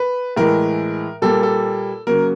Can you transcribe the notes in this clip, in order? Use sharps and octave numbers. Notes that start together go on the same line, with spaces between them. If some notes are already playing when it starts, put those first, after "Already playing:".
Already playing: B4
A2 E3 G#3 A#4
A#2 G3 A#3 A4
A4
C#3 F#3 A#3 A#4